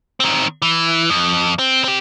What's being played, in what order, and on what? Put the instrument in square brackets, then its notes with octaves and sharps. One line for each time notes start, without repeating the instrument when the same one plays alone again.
[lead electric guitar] D#3 C4
E3
F2
C4
C4 G4